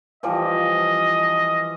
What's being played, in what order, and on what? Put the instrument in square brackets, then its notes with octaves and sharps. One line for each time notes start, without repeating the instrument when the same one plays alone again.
[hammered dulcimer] E3 F3 G3 [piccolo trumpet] D#5